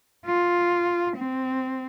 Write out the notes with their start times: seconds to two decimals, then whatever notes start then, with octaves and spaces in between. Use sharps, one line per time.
0.26 F4
1.17 C4